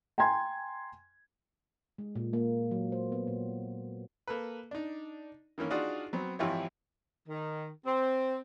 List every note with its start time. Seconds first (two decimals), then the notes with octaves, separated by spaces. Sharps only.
0.18 G5 G#5 A#5 C6 G#6
1.98 G#3
2.16 A#2
2.33 A#3
2.71 F#3
2.92 C5
3.12 B3
3.27 A#2
4.28 A#3 A4 B4
4.71 D4 D#4
5.58 D#3 E3 A#3 C#4
5.70 D4 D#4 F4 F#4 G#4 D5
6.13 F#3 B3 C4
6.39 G#1 E3 F3 E4 G4 C#5
7.28 D#3
7.84 C4